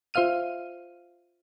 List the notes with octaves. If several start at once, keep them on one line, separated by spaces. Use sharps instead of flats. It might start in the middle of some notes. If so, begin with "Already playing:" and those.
F4 C5 E5 F5 F6 D#7